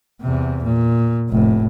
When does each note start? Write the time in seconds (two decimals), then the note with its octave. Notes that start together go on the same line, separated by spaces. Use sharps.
0.21 E2 C3
0.64 A#2
1.30 F1 A2